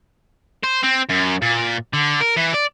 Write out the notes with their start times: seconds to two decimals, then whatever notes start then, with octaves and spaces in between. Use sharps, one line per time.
0.64 C5
0.84 C4
1.10 F#2
1.42 A#2
1.93 D3
2.21 A#4
2.37 E3
2.54 D5